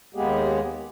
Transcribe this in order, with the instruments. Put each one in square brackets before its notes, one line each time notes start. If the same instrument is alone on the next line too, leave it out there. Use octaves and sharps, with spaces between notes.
[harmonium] D#2 G#3 A#3 B3 G4 G#4